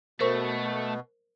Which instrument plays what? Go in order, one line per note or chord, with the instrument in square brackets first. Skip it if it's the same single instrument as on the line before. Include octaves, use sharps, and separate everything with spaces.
[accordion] B2 [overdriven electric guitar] A3 [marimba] A#4 C5 C#6